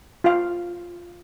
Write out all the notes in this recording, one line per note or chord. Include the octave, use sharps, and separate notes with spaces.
F4 F5